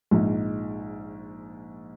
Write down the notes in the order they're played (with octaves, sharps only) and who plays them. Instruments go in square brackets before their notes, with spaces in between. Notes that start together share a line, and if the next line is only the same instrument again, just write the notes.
[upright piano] A#1 G#2